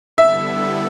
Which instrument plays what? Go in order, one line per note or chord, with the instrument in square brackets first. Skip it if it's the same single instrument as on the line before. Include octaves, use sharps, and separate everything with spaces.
[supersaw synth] D3 G3 B3 E4 A4 [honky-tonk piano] E5